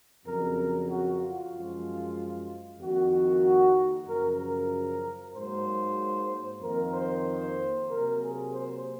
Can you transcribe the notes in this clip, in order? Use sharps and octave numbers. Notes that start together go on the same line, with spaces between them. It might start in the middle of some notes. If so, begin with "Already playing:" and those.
F2 C#3 F#3 A#4
F#4
F4
F#2 F3 G#3
F2 D#3 A#3 F#4
F#2 C#3 F3 A#4
A#4
G#2 F#3 A#3 C5
F2 D#3 A#3 A#4
C5
C3 F#3 A#3 A#4
G#4
C5